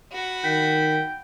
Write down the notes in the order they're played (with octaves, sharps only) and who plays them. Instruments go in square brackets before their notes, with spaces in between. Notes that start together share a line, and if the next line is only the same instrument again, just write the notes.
[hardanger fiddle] F#4 B5
[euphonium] D#3 [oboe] G5 [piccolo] B6